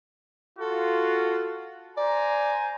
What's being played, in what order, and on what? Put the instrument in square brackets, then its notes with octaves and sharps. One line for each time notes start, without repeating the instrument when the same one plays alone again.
[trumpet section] F4 F#4 [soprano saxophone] A4
[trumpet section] C5 G#5 A#5 [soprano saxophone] D5